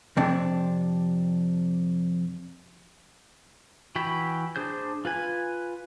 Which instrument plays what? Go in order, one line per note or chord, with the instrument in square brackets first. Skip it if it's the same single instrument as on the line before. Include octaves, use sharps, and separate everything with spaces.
[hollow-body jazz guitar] F2 C3 D4
[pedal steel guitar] E3 F#4 G5 B5
D4 G#4 C5 G6
F4 B4 G#5